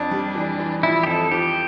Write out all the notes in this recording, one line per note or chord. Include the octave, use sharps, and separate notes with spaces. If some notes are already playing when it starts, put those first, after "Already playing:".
Already playing: F2 D4
G3
E3
E3
F3 E4
G4
F2 A4
F3 G4